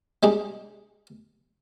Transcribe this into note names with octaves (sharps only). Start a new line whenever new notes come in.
G3 G#3 D4 D#4